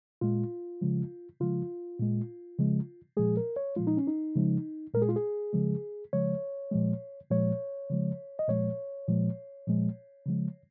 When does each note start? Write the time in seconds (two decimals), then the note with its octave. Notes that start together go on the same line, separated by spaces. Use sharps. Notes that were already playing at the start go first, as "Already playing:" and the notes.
0.21 A#2 G#3 F4
0.81 C#3 F3 G#3
1.41 C#3 F3 G#3 F4
2.00 A#2 G#3
2.58 C#3 F3 G#3
3.17 A#2 F3 G#3 G#4
3.37 A#4
3.56 C#5
3.76 A#2 F3 G#3 F4
3.87 D#4
3.97 C#4
4.07 D#4
4.36 C#3 F3 G#3
4.94 A#2 G#3 A#4
5.02 G#4
5.09 F4
5.16 G#4
5.53 C#3 F3 G#3
6.13 C#3 F3 G#3 C#5
6.71 A#2 F3 G#3
7.31 A#2 F3 G#3 C#5
7.90 C#3 F3 G#3
8.39 D#5
8.48 A#2 F3 G#3 C#5
9.08 A#2 F3 G#3
9.67 A#2 F3 G#3
10.26 C#3 F3 G#3